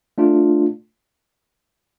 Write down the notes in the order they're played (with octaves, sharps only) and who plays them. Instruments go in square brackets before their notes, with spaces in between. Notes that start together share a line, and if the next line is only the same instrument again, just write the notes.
[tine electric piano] A3 D4 F4